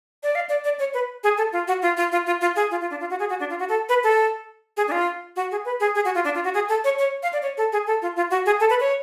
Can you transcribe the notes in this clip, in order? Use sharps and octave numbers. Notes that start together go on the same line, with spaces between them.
D5
F5
D5
D5
C#5
B4
G#4
A4
F4
F#4
F4
F4
F4
F4
F4
G#4
F4
F4
D4
F4
F#4
G#4
F#4
D4
F4
F#4
A4
B4
A4
G#4
D4
F4
F#4
G#4
B4
G#4
G#4
F#4
F4
D4
F4
F#4
G#4
A4
C#5
C#5
F5
D5
C#5
A4
G#4
A4
F4
F4
F#4
G#4
A4
B4
C#5